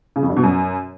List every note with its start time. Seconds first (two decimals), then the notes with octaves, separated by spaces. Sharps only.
0.16 C#3
0.23 F2
0.30 G2
0.37 B2
0.43 F#2